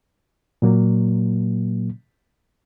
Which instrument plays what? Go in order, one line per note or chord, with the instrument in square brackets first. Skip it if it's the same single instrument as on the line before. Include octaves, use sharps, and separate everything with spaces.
[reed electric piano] A#2 F#3 A#3